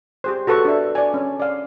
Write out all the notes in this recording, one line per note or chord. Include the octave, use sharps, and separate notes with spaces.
G4 G#4 C5
F#4 A4 B4 A5 C#6
D4 E5
D5 G#5
C#4
D5 F5